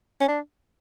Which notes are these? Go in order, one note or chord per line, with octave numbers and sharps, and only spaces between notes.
C#4
D4